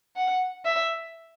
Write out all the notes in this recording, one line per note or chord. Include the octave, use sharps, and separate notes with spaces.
F#5
E5